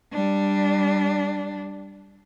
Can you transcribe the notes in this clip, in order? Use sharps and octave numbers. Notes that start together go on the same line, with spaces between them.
G3 D4